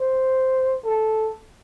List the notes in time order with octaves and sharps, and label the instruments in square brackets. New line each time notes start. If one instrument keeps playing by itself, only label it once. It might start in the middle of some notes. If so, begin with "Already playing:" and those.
Already playing: [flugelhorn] C5
A4